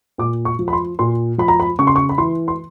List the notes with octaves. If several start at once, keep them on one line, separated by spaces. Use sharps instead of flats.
A#2 D6
C#6
F3
B5
C6
A#2 C6
F3 B5
A#5
B5
C#3 C#6
C6
C#6
B5
E3 C6
C6